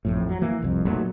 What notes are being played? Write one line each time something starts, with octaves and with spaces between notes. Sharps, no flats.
A1 F2 A2
F#3
E3 A#3
E1 C2 F2
B1 A#2 F#3 A3